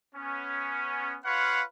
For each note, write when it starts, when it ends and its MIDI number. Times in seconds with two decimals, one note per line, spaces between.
0.16 1.17 59
0.16 1.17 61
1.25 1.62 65
1.25 1.62 71
1.25 1.62 73
1.25 1.62 77
1.25 1.62 78